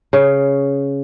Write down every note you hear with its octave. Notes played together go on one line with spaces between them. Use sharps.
C#3